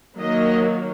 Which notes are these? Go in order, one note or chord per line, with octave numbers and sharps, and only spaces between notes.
D#3 F#3 A#3 D#5